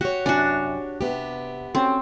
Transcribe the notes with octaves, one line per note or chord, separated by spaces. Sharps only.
F#4 G4 C#5
F#2 C3 D4 F#4 G#5
C3 B3 G4
C4 C#4 F#4 A4